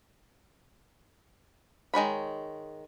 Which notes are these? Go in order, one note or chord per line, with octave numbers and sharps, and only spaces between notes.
D#3 G#3 C#5 B5